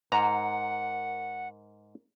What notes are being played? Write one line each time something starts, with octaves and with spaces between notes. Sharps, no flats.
G#2 A#4 F#5 A#5